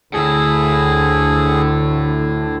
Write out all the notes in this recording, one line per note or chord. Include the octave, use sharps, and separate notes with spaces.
D2 A2 D3 E4 G#4